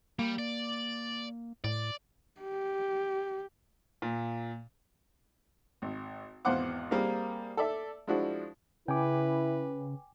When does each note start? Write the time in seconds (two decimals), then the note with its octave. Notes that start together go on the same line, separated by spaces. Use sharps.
0.19 G3 A#3
0.38 D5
1.64 A2 D5
2.41 G4
4.02 A#2
5.82 G#1
6.45 G#1 E2 C5 F5 F#5 D6
6.91 G3 A#3 C4 G#4 A#4
7.57 A4 D5 E5
8.07 F3 G#3 D4 E4 F#4
8.88 C#3 E4 B4 G5 G#5 D6